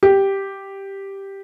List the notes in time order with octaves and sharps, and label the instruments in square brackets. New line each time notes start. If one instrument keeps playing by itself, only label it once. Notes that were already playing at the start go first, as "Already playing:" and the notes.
[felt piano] G4